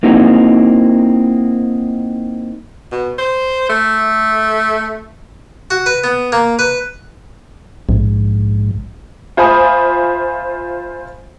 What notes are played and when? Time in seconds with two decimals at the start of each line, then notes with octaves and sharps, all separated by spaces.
0.03 A#3 C4 D#4 E4 F#4
2.92 B2
3.19 C5
3.69 A3
5.71 F#4
5.86 B4
6.04 B3
6.32 A#3
6.59 B4
7.89 A#1 G#2
9.37 F4 C5 E5 G#5 B5 D#6